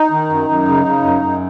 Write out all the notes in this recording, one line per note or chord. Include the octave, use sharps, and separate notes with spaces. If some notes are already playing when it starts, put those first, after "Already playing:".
Already playing: D#4
D#3
F#2
F#2
C#3
C#3
F#2
F#2